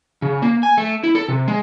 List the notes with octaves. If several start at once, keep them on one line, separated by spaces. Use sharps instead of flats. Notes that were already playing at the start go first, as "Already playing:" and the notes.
C#3
A#3
G#5
A3
E4
A4
C3
G#3